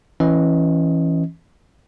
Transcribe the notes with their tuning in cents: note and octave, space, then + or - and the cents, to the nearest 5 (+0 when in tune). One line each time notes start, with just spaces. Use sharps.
E3 +0 C#4 -20 D#5 +20